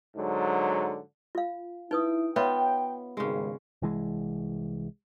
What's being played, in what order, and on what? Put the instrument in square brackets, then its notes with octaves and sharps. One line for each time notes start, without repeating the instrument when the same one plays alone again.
[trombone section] G#2 D3 F#3
[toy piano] F4 F5
[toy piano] D#4 B4 D#6 [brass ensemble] E4 [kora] G5
[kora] B3 F4 [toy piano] B4 C#5 E5 [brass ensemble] G5
[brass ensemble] G#1 G2 [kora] C#3 G#3
[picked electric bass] C2 E3 G#3